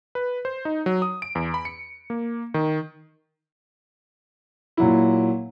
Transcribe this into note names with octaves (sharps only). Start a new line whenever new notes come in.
B4
C5
D#4
F#3
D#6
D7
E2
B5
C#7
A#3
D#3
A#2 F#3 E4